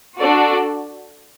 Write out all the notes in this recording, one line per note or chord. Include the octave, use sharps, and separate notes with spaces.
D4 F#4 A4 D5